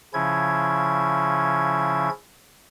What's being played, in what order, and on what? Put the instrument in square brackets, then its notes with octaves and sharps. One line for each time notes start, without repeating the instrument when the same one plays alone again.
[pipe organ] C#3 F3 C#4 E4 G#6